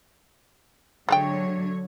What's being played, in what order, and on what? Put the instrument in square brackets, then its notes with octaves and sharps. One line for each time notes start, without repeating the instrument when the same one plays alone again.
[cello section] D3 F#3 C#5 [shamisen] G#3 A3 G5